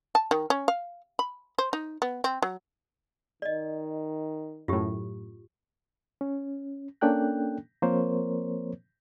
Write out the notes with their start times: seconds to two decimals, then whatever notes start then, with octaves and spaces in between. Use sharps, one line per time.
0.15 A5
0.31 D#3
0.50 C#4
0.68 F5
1.19 B5
1.58 C5
1.73 D#4
2.02 B3
2.24 C4
2.42 F#3
3.42 D#3 D5 D#5
4.68 F#2 A2 F4 G4
6.21 C#4
7.01 A#3 C#4 D4 A4 G5 F#6
7.82 F3 A#3 C4 A#4 C5 C#5